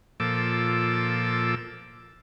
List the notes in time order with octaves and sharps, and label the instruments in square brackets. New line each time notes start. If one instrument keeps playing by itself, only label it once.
[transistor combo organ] A#2 F3 A4 D6 E6